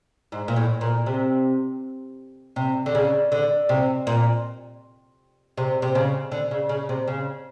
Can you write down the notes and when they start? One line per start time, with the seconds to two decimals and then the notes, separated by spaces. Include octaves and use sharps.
0.32 G#2
0.48 A#2
0.56 A2
0.81 A#2
1.06 C3
2.56 C3
2.86 D3
2.95 C#3
3.32 D3
3.69 C3
4.07 A#2
5.57 C3
5.82 C3
5.95 C#3
6.32 D3
6.51 C#3
6.69 C#3
6.89 C3
7.07 C#3